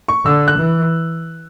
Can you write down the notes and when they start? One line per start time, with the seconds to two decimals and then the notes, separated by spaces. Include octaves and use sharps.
0.08 C#6
0.25 D3 E6
0.48 F#6
0.58 E3